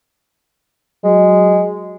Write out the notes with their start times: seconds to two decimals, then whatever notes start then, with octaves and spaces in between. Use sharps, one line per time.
1.04 F#3 G#3